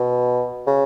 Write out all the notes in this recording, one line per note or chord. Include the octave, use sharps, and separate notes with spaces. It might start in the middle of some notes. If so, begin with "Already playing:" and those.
Already playing: B2
C#3